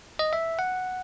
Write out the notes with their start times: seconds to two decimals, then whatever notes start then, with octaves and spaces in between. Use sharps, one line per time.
0.19 D#5
0.33 E5
0.59 F#5